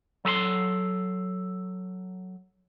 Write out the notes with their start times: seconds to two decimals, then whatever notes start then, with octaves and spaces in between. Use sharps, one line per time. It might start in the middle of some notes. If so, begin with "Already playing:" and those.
0.25 F#3 A4 A5 C6